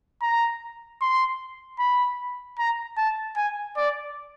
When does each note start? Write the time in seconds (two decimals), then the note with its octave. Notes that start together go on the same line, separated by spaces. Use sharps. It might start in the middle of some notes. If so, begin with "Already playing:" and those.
0.22 A#5
1.01 C6
1.79 B5
2.58 A#5
2.97 A5
3.36 G#5
3.77 D5